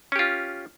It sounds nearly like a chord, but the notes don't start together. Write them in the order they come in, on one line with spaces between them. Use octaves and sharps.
C#4 G4 F4